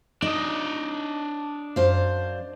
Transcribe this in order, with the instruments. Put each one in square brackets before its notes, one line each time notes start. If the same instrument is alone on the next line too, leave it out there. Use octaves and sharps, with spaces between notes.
[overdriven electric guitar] D4 D#5 [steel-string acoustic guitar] D#4
[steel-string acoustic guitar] F#2 C5 F5